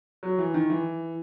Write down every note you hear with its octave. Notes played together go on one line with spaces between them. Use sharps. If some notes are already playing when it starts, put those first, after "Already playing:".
F#3
E3
D#3
E3